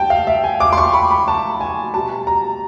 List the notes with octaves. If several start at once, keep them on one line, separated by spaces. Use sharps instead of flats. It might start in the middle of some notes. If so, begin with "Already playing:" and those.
Already playing: G3 G5 A5
F5
E5
G#5
D6
C6
C#6
B5
B5
A5
G#5
B2 G3 A5
A#5